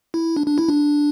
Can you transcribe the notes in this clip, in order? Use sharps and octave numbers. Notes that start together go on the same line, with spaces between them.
E4
D4
D4
E4
D4